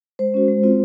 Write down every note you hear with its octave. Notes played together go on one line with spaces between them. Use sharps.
G#3 C5
C#4 F#4
G#3
C4 F4